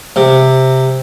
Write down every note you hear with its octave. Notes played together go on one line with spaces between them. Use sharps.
C3